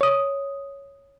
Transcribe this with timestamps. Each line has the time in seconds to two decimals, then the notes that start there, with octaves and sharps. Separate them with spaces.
0.01 C#5 D#6